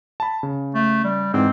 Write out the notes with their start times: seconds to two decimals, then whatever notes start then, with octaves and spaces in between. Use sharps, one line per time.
0.20 A5 B5
0.43 C#3
0.75 A3
1.04 G3
1.34 G#2 E3 C4